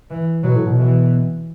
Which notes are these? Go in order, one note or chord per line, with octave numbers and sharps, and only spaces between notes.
E3
B2 F#3
A2
B2
E3